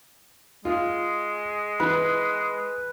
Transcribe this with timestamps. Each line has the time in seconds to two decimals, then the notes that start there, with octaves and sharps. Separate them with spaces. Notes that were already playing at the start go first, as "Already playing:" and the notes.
0.65 G#3 F4
1.80 E3 B4